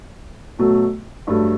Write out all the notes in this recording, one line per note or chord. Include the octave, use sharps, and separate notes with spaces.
B2 F#3 A3
G2 F#3 A3